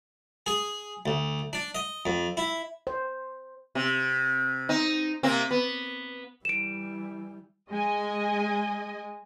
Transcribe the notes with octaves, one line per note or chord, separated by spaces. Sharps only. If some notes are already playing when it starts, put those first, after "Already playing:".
G#4
D2
D4
D#5
F2
E4
C5
C3
C4 D#4
C3 A#3 C4
B3
E3 G3 D7 E7
G#3 D#5 G#5